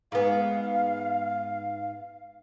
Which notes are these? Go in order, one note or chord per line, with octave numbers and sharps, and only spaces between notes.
G#2 B3 F5